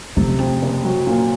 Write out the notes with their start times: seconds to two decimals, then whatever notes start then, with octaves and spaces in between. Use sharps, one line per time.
0.16 C3 A3
0.39 F2
0.62 F#1
0.84 F#3
1.07 A#2